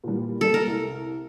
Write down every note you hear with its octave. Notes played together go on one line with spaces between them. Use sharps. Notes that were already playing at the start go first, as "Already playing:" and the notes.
A#2 E3 G3
G3 G#3 A#3 A4
A#4
C2